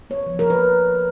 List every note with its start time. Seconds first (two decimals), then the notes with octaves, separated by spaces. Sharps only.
0.10 B3 C#5
0.26 F3
0.39 F3 A#4
0.50 B4